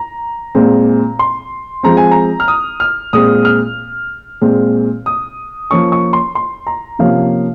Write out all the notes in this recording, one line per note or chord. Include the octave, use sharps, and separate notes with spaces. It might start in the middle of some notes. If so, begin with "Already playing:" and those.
Already playing: A#5
A#2 G#3 C4
C6
F3 G#3 C4 A#5
G#5
A#5
F6
D#6
F6
A#2 G#3 C4 D#6
F6
A#2 G#3 C4
D#6
F3 A#3 C#4 C#6
C#6
C6
C6
A#5
C3 F3 A#3 C#4 F5